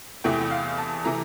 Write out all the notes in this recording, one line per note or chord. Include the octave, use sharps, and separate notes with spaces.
E2 C3 E3 A3 G5
G5
F5
A5
C3 E3 A3 A#5